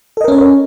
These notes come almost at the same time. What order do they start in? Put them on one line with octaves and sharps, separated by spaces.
A4 D#5 A#4 C#4 C#5